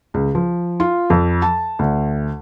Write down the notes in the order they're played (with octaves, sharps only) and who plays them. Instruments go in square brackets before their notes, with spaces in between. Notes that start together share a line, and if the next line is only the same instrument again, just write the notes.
[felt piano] C#2
F3
F4
F2
A5
D2